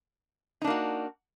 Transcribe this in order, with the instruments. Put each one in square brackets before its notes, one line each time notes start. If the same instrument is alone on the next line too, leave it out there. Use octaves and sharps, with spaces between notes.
[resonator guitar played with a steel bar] D#4
D4
A#3
F#4